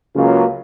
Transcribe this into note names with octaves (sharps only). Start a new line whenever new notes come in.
C#2 C#3 F#3 A#3 F4